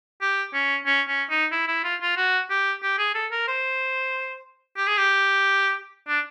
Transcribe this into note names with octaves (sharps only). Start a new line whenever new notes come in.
G4
C#4
C#4
C#4
D#4
E4
E4
F4
F4
F#4
G4
G4
G#4
A4
A#4
C5
G4
G#4
G4
D4